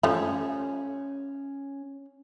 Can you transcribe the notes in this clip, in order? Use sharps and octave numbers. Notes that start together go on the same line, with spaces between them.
F3 G3 A3 C#4